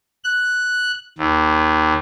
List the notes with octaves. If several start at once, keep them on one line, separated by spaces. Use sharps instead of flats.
F#6
D#2